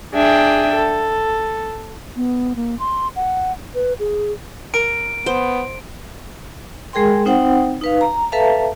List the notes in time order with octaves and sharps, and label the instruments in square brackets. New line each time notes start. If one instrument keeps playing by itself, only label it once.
[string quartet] D4 G#4 E5 G5
A4
[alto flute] B3
A#3
C6
F#5
B4
G#4
[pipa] A#4 [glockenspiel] D7
[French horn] B3 [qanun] C5
[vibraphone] G#3 G#4 A#4 G5 C6
C4 D#4 C5 F#5 G5
D#4 B4 F5
A#5
A4 B4 E5 F5 A5 A#5